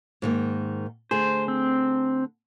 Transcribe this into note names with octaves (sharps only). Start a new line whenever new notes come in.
G#2 D#3 A#3
D3 A3 G#4 C5
C4